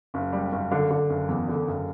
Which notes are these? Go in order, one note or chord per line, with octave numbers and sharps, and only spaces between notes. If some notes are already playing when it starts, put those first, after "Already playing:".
F#1
G3
F#1
D3
D3
F#1
E2
D3
F#1